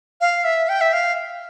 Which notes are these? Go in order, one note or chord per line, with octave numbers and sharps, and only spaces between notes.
F5
E5
G5
E5
F5